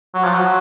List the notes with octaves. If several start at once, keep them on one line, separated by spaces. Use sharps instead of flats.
F#3
F3
F#3